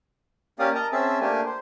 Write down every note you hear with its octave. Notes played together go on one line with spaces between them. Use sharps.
A#3 C#4 G4 D5 F5 D#6
A#4 D#5 A5 A#5
C4 C#4 G#4 E5 A5 E6
A3 A#3 D4 G4 G#5
C5